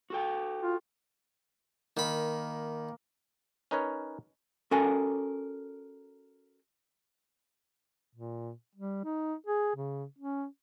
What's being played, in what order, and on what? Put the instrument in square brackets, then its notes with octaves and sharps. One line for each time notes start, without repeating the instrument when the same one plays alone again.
[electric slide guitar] F#4 A4 G5
[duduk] F4
[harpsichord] D#3 B5 [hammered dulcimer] A#3
[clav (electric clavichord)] C#4 D#4 A#4 B4 C#5
[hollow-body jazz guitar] C#4 F#4 A4 A#4 G#5
[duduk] A#2
G3
D#4
G#4
C#3
C#4